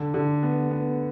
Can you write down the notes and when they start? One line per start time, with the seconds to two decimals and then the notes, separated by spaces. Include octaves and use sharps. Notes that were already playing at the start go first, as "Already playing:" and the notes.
Already playing: D3
0.14 D3
0.43 B3
0.71 B3